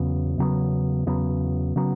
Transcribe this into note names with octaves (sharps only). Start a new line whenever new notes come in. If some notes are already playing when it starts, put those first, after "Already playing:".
Already playing: E2 C#3 F#3 B3
E2 C#3 F#3 B3
E2 C#3 F#3 B3
C#3 F#3 B3